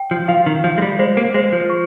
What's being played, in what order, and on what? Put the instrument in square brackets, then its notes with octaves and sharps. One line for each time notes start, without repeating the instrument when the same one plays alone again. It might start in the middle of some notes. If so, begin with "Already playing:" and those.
Already playing: [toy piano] G5
[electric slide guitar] F3
[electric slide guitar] F3 [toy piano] F5
[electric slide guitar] D#3
[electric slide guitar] F3 [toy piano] F5
[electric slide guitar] G#3
G3
[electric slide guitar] G#3 [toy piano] C5
[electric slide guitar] A#3
[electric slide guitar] G#3 [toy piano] C5
[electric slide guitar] F3
[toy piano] C#6